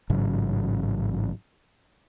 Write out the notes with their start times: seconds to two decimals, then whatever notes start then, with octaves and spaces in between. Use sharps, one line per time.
0.10 A1 G#2 C#3 F#3